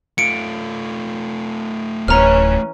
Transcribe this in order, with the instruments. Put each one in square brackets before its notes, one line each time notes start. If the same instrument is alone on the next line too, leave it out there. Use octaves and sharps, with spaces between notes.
[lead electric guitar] A3 F4 [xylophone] C#7 D7
[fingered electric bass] D1 [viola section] E3 C#4 [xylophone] A#5 F6